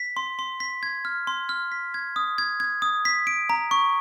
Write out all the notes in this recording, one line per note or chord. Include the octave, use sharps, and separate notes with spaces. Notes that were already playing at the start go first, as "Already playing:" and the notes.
Already playing: B6
C6
C6
B6
G#6
F6
C6
F6
B6
G#6
D#6
G#6
G#6
D#6
B6
D7
A#5
C#6